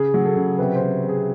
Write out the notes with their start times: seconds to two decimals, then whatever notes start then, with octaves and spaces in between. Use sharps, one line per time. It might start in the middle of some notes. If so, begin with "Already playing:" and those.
Already playing: C#3 G#4
0.14 F#3
0.25 A4
0.36 C#3
0.58 C3 B4
0.75 C5
0.81 C3
1.04 C3
1.09 G#4